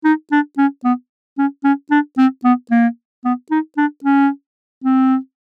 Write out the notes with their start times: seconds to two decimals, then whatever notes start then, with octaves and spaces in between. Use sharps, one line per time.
0.05 D#4
0.32 D4
0.58 C#4
0.84 B3
1.38 C#4
1.64 C#4
1.91 D4
2.18 C4
2.44 B3
2.71 A#3
3.25 B3
3.51 D#4
3.77 D4
4.04 C#4
4.84 C4